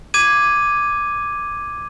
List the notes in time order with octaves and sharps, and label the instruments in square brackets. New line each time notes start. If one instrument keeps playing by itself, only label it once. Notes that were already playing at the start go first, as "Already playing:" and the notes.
[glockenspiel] D6 G#6 D#7